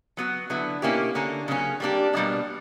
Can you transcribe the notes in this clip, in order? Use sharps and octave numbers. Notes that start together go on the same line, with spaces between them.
F#3 B3 F#4
D3 F#3 B3 E4
B2 A#3 C#4 E4 G4
D3 A#3 C#4
C#3 F#3 A#3 C#4
G3 A#3 D4 G4
B2 G3 A#3 D4